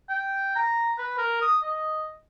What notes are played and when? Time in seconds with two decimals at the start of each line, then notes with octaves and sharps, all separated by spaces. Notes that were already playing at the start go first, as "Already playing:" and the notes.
0.10 G5
0.56 A#5
0.98 B4
1.18 A#4
1.41 D#6
1.63 D#5